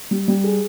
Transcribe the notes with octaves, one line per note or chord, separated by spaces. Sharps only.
G3
G3
G#4